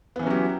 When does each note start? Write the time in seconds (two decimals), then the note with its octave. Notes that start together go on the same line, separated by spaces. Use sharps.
0.16 B3
0.19 E3
0.23 C#4
0.27 F#3
0.30 G4